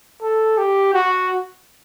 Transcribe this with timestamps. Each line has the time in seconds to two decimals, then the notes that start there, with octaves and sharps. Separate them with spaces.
0.22 A4
0.58 G4
0.94 F#4